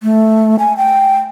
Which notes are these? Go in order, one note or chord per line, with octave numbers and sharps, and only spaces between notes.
A3
G#5
G5